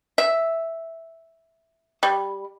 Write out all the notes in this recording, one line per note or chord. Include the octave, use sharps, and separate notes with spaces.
E5
G3